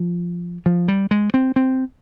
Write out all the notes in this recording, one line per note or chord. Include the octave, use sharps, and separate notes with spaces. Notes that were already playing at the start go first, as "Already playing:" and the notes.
Already playing: F3
F3
G3
G#3
C4
C4